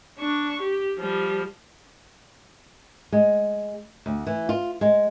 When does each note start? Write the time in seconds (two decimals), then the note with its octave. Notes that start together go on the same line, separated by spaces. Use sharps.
0.19 D4 C#6
0.61 G4
1.00 F3 G3
3.12 G#3
4.06 D2
4.27 E3
4.49 F4
4.81 G#3